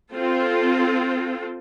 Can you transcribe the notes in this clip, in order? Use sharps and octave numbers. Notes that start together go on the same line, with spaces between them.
C4 F4 A4